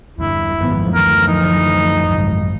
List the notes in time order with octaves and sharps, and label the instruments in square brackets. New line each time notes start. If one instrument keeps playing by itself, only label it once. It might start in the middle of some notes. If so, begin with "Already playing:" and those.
[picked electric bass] E2 G2 D3 [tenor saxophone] E4
[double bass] G#1 B3 [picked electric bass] F#2 D#3 [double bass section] F3
[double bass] D2 E3 [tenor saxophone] A#4
[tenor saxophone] D#4
[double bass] G#1 C#2